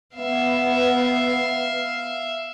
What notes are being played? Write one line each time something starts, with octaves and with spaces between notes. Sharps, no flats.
B3 E5 F5